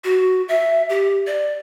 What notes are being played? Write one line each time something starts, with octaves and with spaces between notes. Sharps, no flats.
F#4
E5
G4
D5